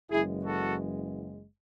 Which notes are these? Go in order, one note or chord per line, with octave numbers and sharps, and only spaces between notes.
F#1 F#2 E3 G#3 E4 G#4
F#4 A4